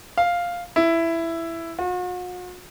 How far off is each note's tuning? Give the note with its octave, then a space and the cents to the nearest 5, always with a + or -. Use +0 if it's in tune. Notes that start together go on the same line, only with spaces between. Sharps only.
F5 +0
E4 +10
F#4 -45